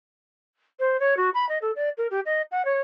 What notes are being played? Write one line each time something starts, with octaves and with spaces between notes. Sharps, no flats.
C5
C#5
F#4
B5
D#5
A4
D5
A#4
G4
D#5
F#5
C#5